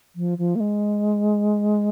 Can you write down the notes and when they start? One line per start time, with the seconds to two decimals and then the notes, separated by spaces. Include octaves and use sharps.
0.16 F3
0.38 F3
0.55 A#3
0.60 G#3